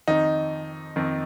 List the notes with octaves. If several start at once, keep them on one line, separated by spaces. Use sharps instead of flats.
F2 D#3 D#4
F2 D#3